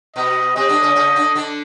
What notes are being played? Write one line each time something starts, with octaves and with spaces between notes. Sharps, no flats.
B2 B3 D#5
C3 C4 D#5
D3 D4
C#3 C#4
C#3 C#4
D3 D4
D3 D4